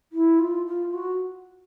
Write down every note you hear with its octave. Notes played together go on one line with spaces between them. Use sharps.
E4
F4
F4
F#4